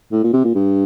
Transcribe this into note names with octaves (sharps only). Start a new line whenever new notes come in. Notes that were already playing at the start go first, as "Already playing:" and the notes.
A2
A#2
C3
A#2
G2